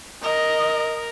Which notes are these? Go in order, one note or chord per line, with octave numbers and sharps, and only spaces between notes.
A#4 D#5